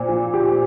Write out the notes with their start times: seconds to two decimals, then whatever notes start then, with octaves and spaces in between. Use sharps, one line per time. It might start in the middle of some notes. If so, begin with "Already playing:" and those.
Already playing: A#2 C4
0.09 F3
0.34 G4